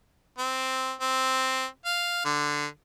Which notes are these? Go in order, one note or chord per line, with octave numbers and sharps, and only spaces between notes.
C4
C4
F5
D3